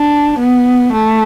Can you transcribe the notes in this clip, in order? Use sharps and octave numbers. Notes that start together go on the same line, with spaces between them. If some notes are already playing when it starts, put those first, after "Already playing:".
Already playing: D4
B3
A3